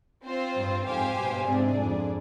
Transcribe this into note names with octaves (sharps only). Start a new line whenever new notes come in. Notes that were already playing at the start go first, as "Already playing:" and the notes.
C4 F4 C5
G2
F2 G#2 G4 C5 F5 G#5
G2 B2
G#2 C3 D4 G#4 D5
F2 G#2